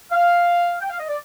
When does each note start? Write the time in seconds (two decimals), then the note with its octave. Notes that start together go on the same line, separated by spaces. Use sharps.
0.11 F5
0.81 G5
0.90 F5
0.99 D#5
1.08 D5